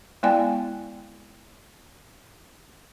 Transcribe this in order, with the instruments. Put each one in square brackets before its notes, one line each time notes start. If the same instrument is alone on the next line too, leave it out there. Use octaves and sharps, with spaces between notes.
[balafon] G#3 B3 E4 D5 G5 G#5